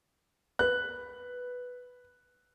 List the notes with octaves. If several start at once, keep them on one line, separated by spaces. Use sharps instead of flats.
B4 F#6